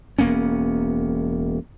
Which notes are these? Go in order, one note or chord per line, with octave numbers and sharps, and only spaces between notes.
E1 A#3 B3 C#4